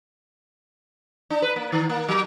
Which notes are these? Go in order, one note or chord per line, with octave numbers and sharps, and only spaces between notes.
D4
B4
A#3
D#3
A#3
F#3